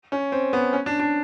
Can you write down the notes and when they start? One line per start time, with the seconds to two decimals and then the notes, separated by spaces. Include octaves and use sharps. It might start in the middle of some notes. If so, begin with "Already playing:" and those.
0.12 C#4
0.32 C4
0.53 B3
0.73 C#4
0.86 D4
1.00 D4